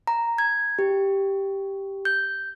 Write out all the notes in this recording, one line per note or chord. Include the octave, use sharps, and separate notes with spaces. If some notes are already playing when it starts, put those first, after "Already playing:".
A#5
G#6
G4
G6